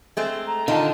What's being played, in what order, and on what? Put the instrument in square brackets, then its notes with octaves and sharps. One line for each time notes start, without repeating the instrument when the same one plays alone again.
[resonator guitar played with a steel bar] G#3 A3 C4
[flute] A#5
[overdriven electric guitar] D3 A5 [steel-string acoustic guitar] D#3 [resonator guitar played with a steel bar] F4